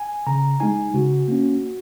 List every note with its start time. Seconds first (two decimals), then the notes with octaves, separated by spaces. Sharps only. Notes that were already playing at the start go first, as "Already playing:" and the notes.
Already playing: G#5
0.27 C#3 A#5
0.60 G#3 D#4 G#5
0.94 C#3 F#4
1.28 A#3 C#4